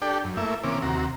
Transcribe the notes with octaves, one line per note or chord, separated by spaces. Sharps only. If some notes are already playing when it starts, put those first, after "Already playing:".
D4 G4 A4 D5 G5
F#2
A3 A#3 E4 E5
C3 E3 A#3 C#4 D6
D#2 C3 F#4 A#5